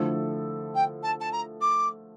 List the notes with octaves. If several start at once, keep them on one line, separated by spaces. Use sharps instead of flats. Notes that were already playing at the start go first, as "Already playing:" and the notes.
Already playing: D3 F3 A3 E4 A4
G5
A5
A5
A#5
D6